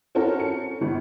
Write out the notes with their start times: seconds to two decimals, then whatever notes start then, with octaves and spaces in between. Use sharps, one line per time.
0.15 C4 C#4 E4 F#4 A4 A#4
0.40 C#7
0.81 G1 E3